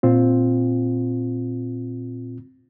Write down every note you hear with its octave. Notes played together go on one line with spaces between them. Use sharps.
A#2 C4 F4